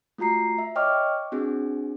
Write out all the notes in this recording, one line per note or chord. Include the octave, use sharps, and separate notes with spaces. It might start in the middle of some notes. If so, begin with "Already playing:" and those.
A3 F4 F#4 A#5 C7
E5
C#5 D#5 G5 C#6 D6 F6
C4 D4 F#4 G#4